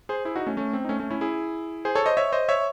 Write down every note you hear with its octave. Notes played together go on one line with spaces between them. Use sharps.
G#4 C5
E4 G#4
D#4 F#4
A3 C#4
A3 C#4
C4
D#4
A3 C#4
A3 C#4
C#4 E4
E4 G#4
G#4 C5
A4 C#5
C5 D#5
C#5 E5
C5 D#5
C#5 E5